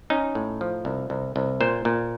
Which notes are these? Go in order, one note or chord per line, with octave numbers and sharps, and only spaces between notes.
C#4 D#4
A2
F3
C2
C2
C2
A#2 C5
A#2